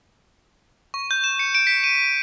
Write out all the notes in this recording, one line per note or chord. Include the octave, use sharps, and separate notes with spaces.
C#6
G6
E7
C#7
D7
B6
D#7